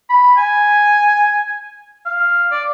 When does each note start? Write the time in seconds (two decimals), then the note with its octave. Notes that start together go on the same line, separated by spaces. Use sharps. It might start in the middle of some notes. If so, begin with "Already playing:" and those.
0.09 B5
0.37 G#5
2.06 F5
2.51 D5